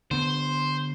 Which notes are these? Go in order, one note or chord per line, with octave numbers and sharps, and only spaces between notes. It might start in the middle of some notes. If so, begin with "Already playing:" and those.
D3 B3 C5